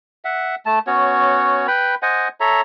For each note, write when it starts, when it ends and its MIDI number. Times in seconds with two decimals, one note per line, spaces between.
0.25 0.55 76
0.25 0.55 78
0.66 0.79 57
0.66 0.79 81
0.87 1.67 59
0.87 1.67 61
0.87 1.67 66
0.87 1.67 73
1.68 1.95 71
1.68 1.95 79
1.68 1.95 83
2.02 2.28 72
2.02 2.28 75
2.02 2.28 78
2.02 2.28 80
2.40 2.61 69
2.40 2.61 73
2.40 2.61 76
2.40 2.61 82